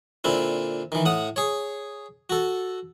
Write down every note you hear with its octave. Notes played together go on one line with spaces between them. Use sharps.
A#2 D3 C4 E4
D#3 E3
A2 F#5 D#6
G#4 C#5
F#4 A4